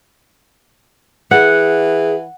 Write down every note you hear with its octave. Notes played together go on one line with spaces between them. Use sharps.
E3 G#4 F#5